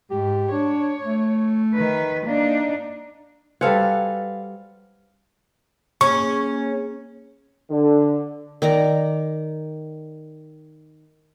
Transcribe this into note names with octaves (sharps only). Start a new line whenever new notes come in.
G#2 G4
D4 C#5
A3
D#3 B4
A#3 D4 D#4
G3 F#4 A4 B4 C5 F5 F#5 G#5
A#3 C#4 G#4 G#5 C#6
D3
D#3 D5 A#5